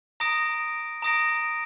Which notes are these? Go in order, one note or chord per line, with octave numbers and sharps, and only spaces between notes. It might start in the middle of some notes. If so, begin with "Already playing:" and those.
A#5 D#6 A#6 D7
A#5 D#6 A#6 D7